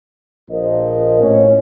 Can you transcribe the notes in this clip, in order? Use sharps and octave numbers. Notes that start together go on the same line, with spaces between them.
A#1 A#2 F3 A#4 D#5
A2 C#4